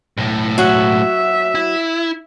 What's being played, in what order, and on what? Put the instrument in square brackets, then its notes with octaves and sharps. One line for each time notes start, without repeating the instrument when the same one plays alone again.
[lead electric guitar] B1 A2
[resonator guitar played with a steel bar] F#3 F#4 [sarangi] E5
[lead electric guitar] E4